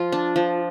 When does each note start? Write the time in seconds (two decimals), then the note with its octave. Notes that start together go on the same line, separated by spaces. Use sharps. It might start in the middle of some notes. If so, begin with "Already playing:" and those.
Already playing: F3 F4
0.12 D4
0.36 F3